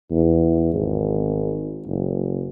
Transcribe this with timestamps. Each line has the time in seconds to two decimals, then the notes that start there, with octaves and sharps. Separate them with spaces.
0.11 E2
0.74 G#1
1.87 F#1